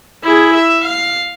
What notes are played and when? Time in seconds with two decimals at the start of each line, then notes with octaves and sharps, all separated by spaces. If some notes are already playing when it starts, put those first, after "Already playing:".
0.24 E4 G#4
0.55 E5
0.84 F5